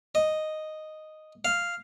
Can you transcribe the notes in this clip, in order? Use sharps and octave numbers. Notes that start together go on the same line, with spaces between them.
D#5
F5